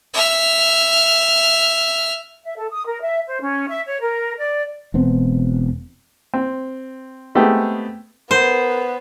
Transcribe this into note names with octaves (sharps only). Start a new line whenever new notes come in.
E5 F6
E5
A4
D#6
A#4
E5
C5
C#4
E5
C#5
A#4
D5
E1 B3 C4
C4
G#3 A3 B3 C4 G4 G#4
B3 A#4 C5